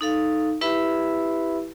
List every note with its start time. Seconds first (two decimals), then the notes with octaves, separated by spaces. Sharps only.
0.01 D#4 A4 F5
0.61 E4 G4 B4 E5 B5